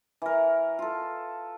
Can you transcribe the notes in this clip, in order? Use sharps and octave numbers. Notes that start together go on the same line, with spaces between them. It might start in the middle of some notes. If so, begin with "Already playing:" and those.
E3 A#4
F4 A4